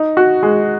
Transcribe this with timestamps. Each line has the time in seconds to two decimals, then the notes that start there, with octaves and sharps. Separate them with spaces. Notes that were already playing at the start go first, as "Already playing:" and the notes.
Already playing: D#4
0.17 F#4
0.43 G#3